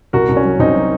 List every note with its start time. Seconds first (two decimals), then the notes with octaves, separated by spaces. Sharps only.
0.13 C2 F#4 A#4
0.29 C2
0.37 C#4
0.45 F#3
0.59 C2 C4 D#4
0.75 F#3